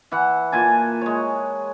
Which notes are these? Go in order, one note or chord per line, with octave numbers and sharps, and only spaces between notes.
E3 F#5
A#2 G#5 A5
G#3 C#5